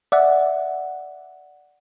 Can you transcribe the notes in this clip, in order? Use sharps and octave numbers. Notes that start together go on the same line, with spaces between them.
D5 E5 F#5